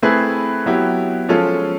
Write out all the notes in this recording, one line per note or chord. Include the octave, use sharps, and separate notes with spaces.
A3 C4 E4 G#4 B4
F#3 B3 E4 G4
F3 G#3 C#4 F4 A4